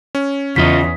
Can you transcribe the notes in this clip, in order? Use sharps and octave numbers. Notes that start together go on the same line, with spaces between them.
C#4
E2 C#3 F4 D#5 D#6 B6